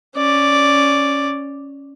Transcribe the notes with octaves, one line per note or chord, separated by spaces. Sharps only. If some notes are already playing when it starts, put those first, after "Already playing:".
C#4 D5